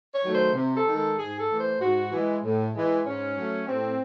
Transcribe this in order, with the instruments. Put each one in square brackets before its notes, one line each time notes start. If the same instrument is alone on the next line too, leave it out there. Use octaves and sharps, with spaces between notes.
[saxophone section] C#5
D#3 F#3 A3
C5
C3
A4
D#3 G#3
A4
G#2 G#4
A4
E3 A3
C5
G#2 F#4
E3 G#3
A2
E3 G#3
G#2 C#4
F#3 A3
A2 C4